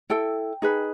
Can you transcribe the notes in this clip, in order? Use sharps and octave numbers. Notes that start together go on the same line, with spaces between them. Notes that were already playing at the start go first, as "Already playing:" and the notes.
E4 A4 G5
D#4 G#4 B4